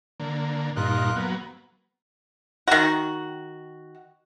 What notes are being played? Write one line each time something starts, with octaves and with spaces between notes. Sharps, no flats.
D3 A#3
G2 A#2 D#4 F4 A#4 F#6
F#3 A#3 B3
D#3 F#4